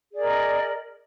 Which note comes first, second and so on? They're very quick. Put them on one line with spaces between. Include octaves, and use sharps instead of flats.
G#4 D5 A#4 D#5